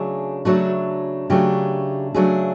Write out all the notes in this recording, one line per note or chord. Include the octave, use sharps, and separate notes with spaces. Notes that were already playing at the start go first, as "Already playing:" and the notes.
Already playing: C#3 F#3 A3 D4 G#4
C#3 F#3 A3 D4 F#4
C#3 F#3 A3 D4 G4
C#3 F#3 A3 D4 G#4